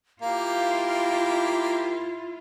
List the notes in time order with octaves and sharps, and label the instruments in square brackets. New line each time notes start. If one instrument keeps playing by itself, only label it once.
[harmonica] A#3 G4 [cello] E4 F4 [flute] F5